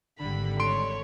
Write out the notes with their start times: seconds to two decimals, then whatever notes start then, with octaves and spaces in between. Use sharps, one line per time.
0.19 G#1 D3 G3 B5
0.60 A4 C#5 C6 D7